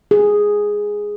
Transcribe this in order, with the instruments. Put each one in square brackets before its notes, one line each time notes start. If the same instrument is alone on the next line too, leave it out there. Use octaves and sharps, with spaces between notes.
[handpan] G#4